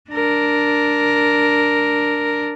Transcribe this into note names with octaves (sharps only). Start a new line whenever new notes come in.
D4 A#4